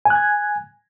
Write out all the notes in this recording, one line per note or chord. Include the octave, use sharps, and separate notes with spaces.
G#5 F#6 G#6